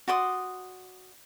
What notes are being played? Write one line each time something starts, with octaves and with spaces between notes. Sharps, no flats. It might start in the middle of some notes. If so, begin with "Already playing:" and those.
F#4 D5 C6 D#6